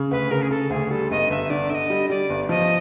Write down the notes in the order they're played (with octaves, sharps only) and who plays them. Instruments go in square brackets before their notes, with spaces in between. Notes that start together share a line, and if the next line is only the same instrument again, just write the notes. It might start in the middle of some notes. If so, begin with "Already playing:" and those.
Already playing: [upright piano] C#3
[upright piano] D2 [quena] B4
[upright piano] C#3 [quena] A#4
[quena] G#4
[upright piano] C#3 [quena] A4
[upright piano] D2 [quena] G#4
[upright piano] G3 [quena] A4
[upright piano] G1 [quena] D#5
[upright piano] G1 [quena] E5
[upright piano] D3 [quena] D5
[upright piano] D3 [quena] E5
[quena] D#5
[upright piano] G3
[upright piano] G3 [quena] D5
[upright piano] G1
[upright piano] F3 [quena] D#5